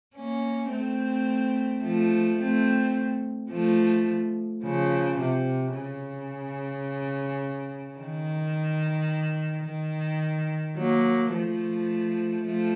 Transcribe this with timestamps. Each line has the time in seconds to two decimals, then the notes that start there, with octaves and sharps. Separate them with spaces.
0.16 A#3 C#4
0.72 A3 C4
1.84 F3 A3
2.40 A3 C4
3.51 F3 A3
4.63 C#3 F3
5.19 C3
5.75 C#3
7.99 D#3
9.66 D#3
10.78 F#3 A#3
11.33 F3 A3
12.45 F3 A3